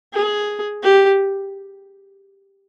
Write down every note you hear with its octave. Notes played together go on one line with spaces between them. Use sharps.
G#4
G4